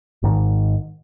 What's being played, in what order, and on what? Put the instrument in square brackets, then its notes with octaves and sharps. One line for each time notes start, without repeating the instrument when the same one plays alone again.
[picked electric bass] G#1 G#2 D#3